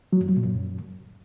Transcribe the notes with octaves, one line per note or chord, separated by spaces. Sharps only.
F#3
F#2
F#3
A#2
F#2